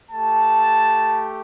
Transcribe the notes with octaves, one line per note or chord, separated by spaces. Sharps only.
A3 G4 A5